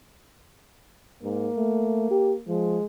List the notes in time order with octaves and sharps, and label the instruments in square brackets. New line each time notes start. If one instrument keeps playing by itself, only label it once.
[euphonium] G#2 [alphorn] A#3
[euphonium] A3
G4
[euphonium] F3 [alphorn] G#3